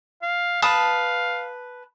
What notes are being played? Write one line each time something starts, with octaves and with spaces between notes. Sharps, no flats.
F5
B4 F5 A5 D#6